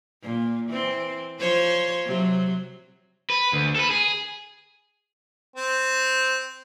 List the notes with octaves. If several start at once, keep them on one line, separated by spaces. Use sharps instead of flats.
A#2
E3 C4
F3 C5 C#5
C3 F#3
B4
D2
A4 B4
G#4
C4